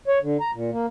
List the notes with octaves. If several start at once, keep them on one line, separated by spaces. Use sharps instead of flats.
C#5
D3
A#5
A#2
A#3